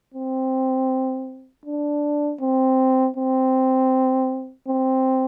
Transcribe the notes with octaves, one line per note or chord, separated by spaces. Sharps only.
C4
D4
C4
C4
C4